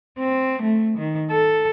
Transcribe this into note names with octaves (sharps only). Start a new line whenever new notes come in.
C4
A3
D#3
A4